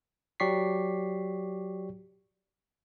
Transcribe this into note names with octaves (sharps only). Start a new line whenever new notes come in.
F#3 G4 D5 C#6 B6 C7